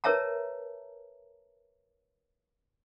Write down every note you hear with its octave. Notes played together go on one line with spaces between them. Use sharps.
A#4 B4 C#5 E5 A5 A#5